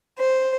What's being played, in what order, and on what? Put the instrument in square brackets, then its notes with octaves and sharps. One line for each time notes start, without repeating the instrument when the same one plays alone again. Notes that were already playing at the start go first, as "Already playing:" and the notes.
[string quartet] C5